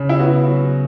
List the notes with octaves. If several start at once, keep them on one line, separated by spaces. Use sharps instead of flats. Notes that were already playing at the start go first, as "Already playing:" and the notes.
Already playing: C#3
E4
B3 F#4
F#3